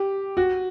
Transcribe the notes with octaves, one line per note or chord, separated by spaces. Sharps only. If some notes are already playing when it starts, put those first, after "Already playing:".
Already playing: G4
F#4